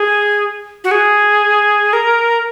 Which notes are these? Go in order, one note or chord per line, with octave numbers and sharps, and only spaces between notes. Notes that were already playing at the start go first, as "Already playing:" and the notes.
Already playing: G#4
F#4
G#4
A#4